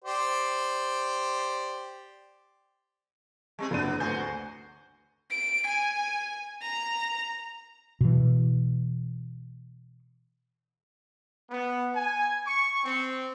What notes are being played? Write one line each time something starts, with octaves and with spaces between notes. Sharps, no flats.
G4 C5 D5
G3 C4 G#4
F#1 C3 B3 D4 D#7
D2 F#4 C5 G#5 G6
D7
G#5
A#5
B2 E3
B3
G#5
C#6
C4